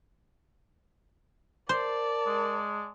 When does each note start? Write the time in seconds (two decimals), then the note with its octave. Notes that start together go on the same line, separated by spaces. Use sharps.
1.69 A#4 C5 D5 A5
2.26 G#3